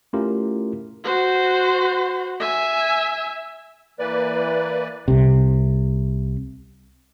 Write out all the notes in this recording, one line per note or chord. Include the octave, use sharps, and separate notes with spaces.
A3 C#4 E4 F4 G4 A#4
F#4 C5
E5 G#5
E3 A#3 B4 D5
C2 C3